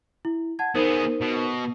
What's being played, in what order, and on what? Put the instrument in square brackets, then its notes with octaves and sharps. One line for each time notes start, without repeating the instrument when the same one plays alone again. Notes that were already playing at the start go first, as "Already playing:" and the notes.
[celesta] E4
F#5 A5 G#6
[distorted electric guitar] B3 G#4 [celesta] D#4 A#4 C5
[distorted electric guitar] B2